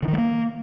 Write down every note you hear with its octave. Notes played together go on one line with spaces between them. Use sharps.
D3
D#3
G#3
A#3